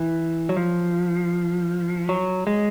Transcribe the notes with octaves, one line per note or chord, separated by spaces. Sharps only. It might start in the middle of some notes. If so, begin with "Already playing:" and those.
Already playing: E3
F#3
F3
F#3
G#3